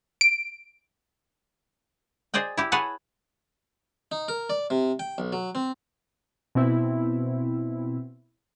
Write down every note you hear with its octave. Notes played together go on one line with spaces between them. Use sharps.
D7
G#4 C5 D5 D#5 G5
E4 G4
G#4 B4 C#5 F#5 G#5 A5
D#4
A#4
D5
C3
G5
B1
F#3
C4
B2 C4 E4